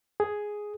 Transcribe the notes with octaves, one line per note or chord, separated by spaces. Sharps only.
G#4